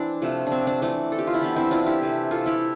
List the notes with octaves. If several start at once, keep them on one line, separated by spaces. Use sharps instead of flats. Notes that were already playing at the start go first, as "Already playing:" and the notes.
Already playing: E3 C4 D4
C3 F3 A3
C4 D4
D4
E3 A3 D4
A4
G4
F4
E4
E3 B3 D4
C4 E4
D4 F4
E4 G4
C3 E3 A3
F4 A4
E4 G4